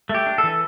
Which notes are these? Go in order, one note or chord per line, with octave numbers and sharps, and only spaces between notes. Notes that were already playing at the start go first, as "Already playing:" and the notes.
A3
G4
D4
A4
E3